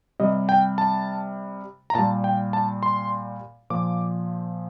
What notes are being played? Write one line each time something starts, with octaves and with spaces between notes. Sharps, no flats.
C3 G3 D#5
G5
A5
A#5
A#2 G3 A5
G5
A5
C6
A#2 F3 D6